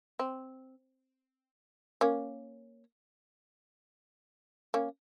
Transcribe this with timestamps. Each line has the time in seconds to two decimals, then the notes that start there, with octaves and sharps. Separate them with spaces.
0.19 C4
2.01 A#3 C#4
4.74 A#3 C#4